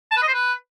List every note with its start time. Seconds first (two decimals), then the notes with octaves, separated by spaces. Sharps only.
0.11 A5
0.17 B4
0.22 D#5
0.28 C5
0.33 B4